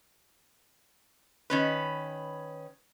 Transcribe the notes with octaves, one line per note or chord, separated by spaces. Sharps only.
D#3 C#4 B4